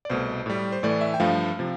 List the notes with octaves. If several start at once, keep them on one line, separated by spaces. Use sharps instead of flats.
D5
C2 B2 A3 C5
A2 G3
C5
A2 E3 A3 D5
E5
G5
G2 F3 A3 F5
C3 F3